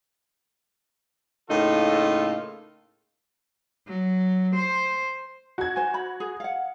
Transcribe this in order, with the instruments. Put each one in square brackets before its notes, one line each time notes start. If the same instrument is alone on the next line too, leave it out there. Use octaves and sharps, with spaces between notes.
[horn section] A2 C#3 A#3 D#4 F4 A4
[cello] F#3
C5
[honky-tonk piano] F#4 G#6
[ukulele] C5 G#5
B5
G#4
F5 F#5